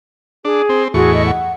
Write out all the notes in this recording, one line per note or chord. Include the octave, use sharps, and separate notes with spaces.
D4 G#4
C4
E2 A2 F#4 G#4 A4 C#6
D#5
F#5